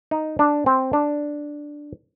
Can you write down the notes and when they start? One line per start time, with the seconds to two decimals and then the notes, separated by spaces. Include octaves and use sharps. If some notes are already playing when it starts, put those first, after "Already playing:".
0.11 D#4
0.39 D4
0.66 C4
0.93 D4